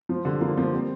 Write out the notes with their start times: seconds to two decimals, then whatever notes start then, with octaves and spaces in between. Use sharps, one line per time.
0.09 F3
0.25 D3 G3
0.41 F3 A#3
0.57 F3 A#3
0.73 G3 C4